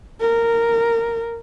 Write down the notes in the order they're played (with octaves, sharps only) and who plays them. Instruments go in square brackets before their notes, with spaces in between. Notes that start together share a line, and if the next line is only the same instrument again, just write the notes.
[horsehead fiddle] A#4